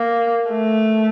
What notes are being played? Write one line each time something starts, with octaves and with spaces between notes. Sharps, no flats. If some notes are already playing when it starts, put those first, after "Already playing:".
Already playing: A#3
A3